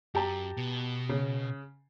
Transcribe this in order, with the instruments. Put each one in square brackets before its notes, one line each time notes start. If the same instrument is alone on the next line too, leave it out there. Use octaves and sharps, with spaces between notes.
[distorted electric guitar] F#2 [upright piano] G4 A5 A#5
[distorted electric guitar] B2
[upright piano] C#3